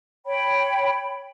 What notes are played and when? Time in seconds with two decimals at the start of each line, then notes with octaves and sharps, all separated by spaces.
0.26 C#5 G5 B5